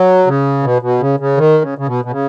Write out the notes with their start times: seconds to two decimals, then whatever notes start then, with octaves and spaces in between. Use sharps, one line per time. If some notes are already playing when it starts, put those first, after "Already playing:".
Already playing: F#3
0.27 C#3
0.63 B2
0.82 B2
1.01 C#3
1.20 C#3
1.37 D#3
1.61 C#3
1.78 C#3
1.87 B2
2.05 B2
2.11 C#3